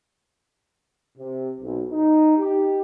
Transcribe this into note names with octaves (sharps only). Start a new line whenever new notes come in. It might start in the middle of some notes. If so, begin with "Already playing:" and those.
C3
B1
D#4
G4